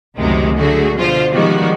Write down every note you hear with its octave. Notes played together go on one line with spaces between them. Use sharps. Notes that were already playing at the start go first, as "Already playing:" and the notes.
C#2 F#2 C3 D#3 G#3 A3
D3 F#3 A3 F#4 G#4
B2 D3 F3 F4 C5
D#3 F3 G3 G#3 B3 F#4